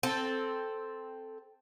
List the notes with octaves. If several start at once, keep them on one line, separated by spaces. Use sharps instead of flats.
C4 A4